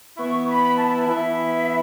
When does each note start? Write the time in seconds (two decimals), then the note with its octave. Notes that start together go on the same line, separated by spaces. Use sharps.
0.17 E3 B3 E4 C#6
0.47 B5
0.77 A5
1.07 E3 B3 E4 E5